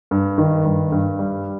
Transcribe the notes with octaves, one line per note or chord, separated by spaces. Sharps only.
G2
D#3
G2
G2
G3